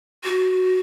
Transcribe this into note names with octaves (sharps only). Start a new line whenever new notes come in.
F#4